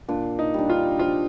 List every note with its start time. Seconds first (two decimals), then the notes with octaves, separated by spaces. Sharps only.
0.08 A#2 D4
0.39 D#4
0.54 G3 D4
0.69 F4
0.99 F3 F4